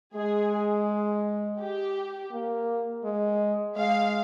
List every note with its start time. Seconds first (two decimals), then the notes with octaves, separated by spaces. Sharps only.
0.14 G#3 G#4
1.60 G4
2.32 A#3
3.04 G#3
3.77 G#3 F5